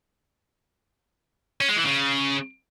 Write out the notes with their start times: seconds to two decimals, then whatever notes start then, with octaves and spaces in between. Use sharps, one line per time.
1.61 C#4
1.69 G#3
1.77 E3
1.85 C#3